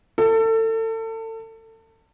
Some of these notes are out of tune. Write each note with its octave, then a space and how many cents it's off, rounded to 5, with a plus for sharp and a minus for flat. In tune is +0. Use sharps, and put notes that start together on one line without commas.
A4 +30